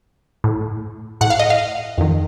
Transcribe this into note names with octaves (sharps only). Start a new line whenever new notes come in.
A2
A2 F#5
F5
D#5
F5
F2 D#3